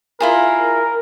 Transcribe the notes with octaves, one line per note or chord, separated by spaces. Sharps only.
E4 F4 G#4 A#4